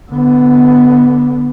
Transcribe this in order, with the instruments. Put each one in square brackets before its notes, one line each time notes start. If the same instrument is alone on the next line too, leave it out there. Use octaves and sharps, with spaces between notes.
[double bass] D3 B3